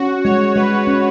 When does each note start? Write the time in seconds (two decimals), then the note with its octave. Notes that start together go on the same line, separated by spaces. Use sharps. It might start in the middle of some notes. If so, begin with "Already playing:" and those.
Already playing: C#4 F#4
0.24 G#3 C#5
0.56 G#3 B4
0.87 C#4